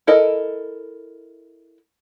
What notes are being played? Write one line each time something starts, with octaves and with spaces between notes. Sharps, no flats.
E4 A4 A#4 D#5